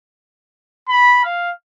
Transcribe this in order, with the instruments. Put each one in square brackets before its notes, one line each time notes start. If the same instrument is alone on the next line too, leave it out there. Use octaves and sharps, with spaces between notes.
[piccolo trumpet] B5
F5